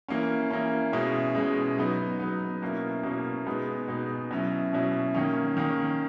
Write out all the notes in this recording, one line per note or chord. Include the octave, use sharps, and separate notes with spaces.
E3 A#3 C#4
E3 A#3 C#4
B2 G#3 C#4 E4
B2 G#3 C#4 E4
F#3 B3 D#4
F#3 B3 D#4
B2 A#3 C#4 E4
B2 A#3 C#4 E4
B2 G#3 B3 D#4
B2 G#3 B3 D#4
B2 F#3 C#4 E4
B2 F#3 C#4 E4
D#3 A#3 C#4
D#3 A#3 C#4